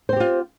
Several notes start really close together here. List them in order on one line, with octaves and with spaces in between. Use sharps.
C5 C4 G4 F4